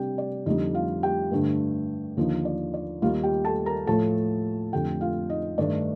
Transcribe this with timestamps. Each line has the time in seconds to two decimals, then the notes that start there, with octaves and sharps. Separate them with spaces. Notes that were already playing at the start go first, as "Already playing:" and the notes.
Already playing: C3 G3 D4 G4 G5
0.18 D5
0.46 F2 D3 G3 D#4 D#5
0.74 F4 F5
1.03 G4 G5
1.31 G2 D3 A3
2.17 D#2 D3 F3 A#3 D#4
2.45 D5
2.74 D5
3.02 D#2 D#3 G3 F4 F5
3.23 G4 G5
3.45 A4 A5
3.66 A#4 A#5
3.87 A2 F3 A3 A4 A5
4.73 F2 D3 A3 G4 G5
5.01 F4 F5
5.30 D#4 D#5
5.58 G2 D#3 A3 D4 D5